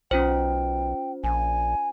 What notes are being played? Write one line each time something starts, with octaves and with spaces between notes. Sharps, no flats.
B1 C#4 F4 C5 G5
A#1 G#5